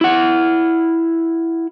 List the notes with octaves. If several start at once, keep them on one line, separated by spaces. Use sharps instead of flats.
E4 F#5